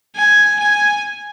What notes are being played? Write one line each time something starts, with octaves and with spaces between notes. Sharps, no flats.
G#5
G#5